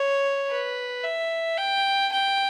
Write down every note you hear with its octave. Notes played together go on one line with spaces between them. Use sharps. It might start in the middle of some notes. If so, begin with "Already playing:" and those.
Already playing: C#5
B4
E5
G5
G5